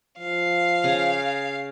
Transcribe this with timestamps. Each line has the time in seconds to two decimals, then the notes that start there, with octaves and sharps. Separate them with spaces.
0.19 F3 F5
0.84 C#3